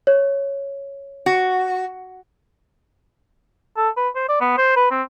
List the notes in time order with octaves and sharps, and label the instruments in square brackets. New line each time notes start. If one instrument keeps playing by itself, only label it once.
[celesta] C#5
[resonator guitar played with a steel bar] F#4
[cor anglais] A4
B4
C5
D5
B3
C5
B4
C4